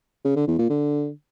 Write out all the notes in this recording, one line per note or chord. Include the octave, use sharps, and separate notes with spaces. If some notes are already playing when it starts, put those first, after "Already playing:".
C#3
D3
E2
A#2
D3